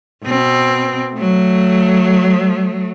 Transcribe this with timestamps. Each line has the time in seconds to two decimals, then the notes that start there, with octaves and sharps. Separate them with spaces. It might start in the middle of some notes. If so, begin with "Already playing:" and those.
0.25 B2 C4
1.14 F#3 A3